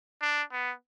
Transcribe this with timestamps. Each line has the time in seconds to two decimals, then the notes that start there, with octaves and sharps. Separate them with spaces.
0.22 D4
0.52 B3